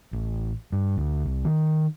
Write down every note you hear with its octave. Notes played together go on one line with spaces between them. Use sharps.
A1
G2
D2
C2
D#3